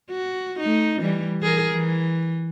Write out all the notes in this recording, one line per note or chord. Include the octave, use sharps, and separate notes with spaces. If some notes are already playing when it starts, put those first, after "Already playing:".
F#4
A3 D#4
E3 G3
E3 G#4 A#4
E3